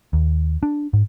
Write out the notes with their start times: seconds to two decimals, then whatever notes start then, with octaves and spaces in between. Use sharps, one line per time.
0.13 D#2
0.63 D4
0.93 G#2